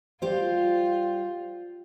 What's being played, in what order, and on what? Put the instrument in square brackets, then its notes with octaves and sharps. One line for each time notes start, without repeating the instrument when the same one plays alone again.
[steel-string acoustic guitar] G3 G4 C5 [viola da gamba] F4